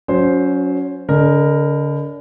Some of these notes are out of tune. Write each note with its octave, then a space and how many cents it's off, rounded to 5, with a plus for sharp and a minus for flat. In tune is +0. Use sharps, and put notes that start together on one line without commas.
F#3 -15 C#4 +20 C5 +0
D3 -40 A#4 +0 D#5 -20